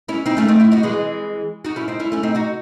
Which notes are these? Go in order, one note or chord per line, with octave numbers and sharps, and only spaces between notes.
C#4 E4
C4 D#4
A3 C#4
C4 D#4
C#4 E4
D#4 F#4
E3 G#3
D#4 F#4
C#4 E4
C4 D#4
C#4 E4
A3 C#4
C4 D#4
D#4 F#4